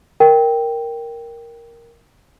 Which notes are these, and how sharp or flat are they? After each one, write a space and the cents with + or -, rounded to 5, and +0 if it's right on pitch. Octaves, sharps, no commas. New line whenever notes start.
A#4 +0 G5 +0